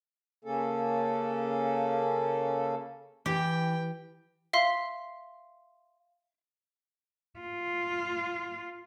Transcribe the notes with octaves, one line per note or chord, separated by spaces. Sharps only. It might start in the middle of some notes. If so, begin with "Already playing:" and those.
C#3 A#3 C#4 A4
E3 G4 G5
E5 F5 C6
F4